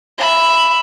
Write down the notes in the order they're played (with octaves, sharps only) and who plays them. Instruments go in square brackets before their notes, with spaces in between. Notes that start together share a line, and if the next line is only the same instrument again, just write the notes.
[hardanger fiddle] E5 B5